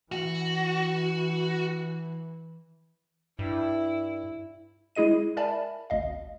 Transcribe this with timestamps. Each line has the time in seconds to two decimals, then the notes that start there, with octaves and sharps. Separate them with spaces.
0.12 E3 F#4
3.39 G2 E4
4.95 G#3 E4 G#4 D#5 D#7
5.37 A#4 D5 E5 G#5 A5 B5
5.90 G#1 D2 D#5 F5